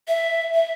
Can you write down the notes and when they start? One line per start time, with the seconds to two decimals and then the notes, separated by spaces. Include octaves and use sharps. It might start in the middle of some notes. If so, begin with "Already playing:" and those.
0.08 E5
0.54 E5